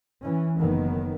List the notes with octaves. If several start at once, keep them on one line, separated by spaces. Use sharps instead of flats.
E3 C#4
F#1 D#3 B3